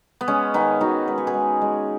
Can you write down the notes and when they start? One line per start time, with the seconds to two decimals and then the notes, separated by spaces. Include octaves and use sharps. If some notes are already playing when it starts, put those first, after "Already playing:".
0.21 B3
0.28 G#3 C#4
0.54 D#3 B3 D#4
0.81 D#3 D#4 F#4
1.07 G#3 B4
1.18 C#5
1.27 G#4 B4
1.34 G#3
1.62 G#3